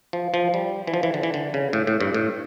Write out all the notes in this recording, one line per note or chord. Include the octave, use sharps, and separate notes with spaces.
F3
F3
G3
E3
F3
E3
D3
E3
D3
C#3
A2
A2
G2
A2